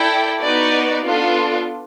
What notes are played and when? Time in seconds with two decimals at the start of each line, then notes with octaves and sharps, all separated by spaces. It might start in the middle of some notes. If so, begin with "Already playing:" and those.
Already playing: E4 A4 D5 G5
0.40 B3 D#4 F#4 B4 D5
1.04 B3 D4 F4 A4